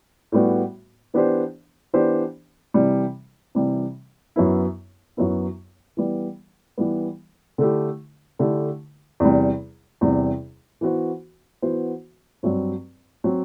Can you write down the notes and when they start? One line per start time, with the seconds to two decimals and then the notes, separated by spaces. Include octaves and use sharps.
0.32 A2 G3 B3 F#4
1.14 E3 B3 D4 G4 C5
1.93 E3 B3 D4 G4 C5
2.74 C3 E3 G3
3.55 C3 E3 G3
4.36 F#2 F#3 B3 E4
5.17 F#2 F#3 B3 E4
5.97 E3 G3 B3
6.78 E3 G3 B3
7.58 D3 A3 E4 G4
8.39 D3 A3 E4 G4
9.20 E2 C3 G3
10.01 E2 C3 G3
10.81 E3 B3 F#4 C5
11.62 E3 B3 F#4 C5
12.43 G2 F#3 C4
13.24 F#3 C4